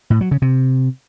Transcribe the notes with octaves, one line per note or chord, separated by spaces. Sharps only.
A2
F#3
C#3
C3